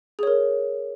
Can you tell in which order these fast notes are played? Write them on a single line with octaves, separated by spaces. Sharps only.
G#4 C#5 A#4